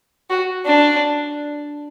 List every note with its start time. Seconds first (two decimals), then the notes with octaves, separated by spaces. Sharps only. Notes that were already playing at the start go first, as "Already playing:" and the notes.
0.30 F#4
0.66 D4